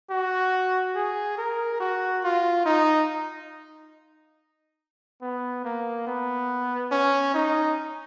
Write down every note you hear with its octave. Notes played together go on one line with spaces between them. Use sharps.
F#4
G#4
A#4
F#4
F4
D#4
B3
A#3
B3
C#4
D#4